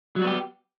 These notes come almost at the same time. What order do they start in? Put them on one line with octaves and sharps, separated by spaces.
F#3 G3 F#4 B3 G4